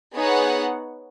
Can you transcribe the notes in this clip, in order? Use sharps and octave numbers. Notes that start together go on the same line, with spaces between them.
B3 D#4 G#4 C#5 F#5